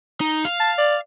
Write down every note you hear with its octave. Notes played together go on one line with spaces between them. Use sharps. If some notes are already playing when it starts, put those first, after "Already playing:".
D#4
F5
A5
D5